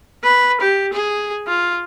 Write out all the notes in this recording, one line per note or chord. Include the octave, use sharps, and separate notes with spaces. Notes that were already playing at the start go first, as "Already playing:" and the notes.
B4
G4
G#4
F4